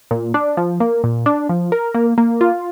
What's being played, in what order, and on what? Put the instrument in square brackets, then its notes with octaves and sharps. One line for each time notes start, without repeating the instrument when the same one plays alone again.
[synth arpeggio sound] A#2
D4
F3
A#3
A#2
D4
F3
A#4
A#3
A#3
F4